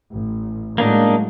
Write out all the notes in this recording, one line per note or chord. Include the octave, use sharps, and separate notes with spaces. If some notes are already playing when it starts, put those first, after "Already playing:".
A1
A2 F#3 G#3 A#3 D4 D#4